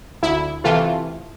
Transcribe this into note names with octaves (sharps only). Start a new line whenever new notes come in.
D2 E4
C3 E3 A3 F4